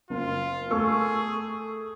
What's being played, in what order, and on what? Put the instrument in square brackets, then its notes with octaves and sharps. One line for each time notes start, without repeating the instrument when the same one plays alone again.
[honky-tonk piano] F#1 [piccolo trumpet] F4
[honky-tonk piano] A3 C#6 E6 [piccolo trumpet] G#4